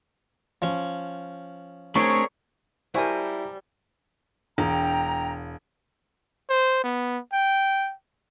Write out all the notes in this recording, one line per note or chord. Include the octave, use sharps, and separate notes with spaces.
F3 C#4
A3 C4 D4 G#4 A#4 C#5 C#6
G3 E4 F#4 A#4 C5 G#5 A5
E1 G5 A#5
C5
B3
G5